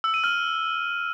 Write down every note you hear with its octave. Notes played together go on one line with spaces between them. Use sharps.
E6
D#7
F6